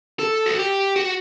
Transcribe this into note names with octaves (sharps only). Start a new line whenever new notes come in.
A4
F#4
G4
F#4